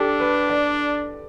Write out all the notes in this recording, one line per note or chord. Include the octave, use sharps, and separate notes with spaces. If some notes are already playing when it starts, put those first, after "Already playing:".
Already playing: D4 G4 A4
B4
D5